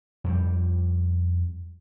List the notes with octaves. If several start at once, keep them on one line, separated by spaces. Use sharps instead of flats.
F2 G3